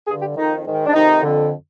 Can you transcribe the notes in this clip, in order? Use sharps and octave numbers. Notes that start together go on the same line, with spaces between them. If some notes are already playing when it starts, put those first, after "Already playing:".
G2 D3 G#4
G4
F2 D#3 D#4
G#2 D#3
D4
F2 C3 D#3 D#4
F2 D3